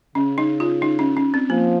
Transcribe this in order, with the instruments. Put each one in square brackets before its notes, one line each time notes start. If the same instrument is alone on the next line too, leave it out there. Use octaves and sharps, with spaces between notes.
[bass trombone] C#3 [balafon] C#4
[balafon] D#4
F4
D#4
C#4
C#4
C4
[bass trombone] F3 [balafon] A#3